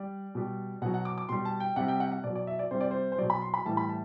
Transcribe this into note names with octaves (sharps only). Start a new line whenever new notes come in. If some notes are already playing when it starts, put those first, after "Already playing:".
Already playing: G3 D5
B2 G3
B2 F#3 F#5
F#5
D6
D6
B2 G3 C6
A5
G5
C3 G3 F#5
G5
F#5
F#5
B2 F#3 D5
D5
E5
D5
C3 G3 C5
D5
C5
C5
B2 F#3 D5
B5
C6
B5
A2 E3 G3 A5
B5
A5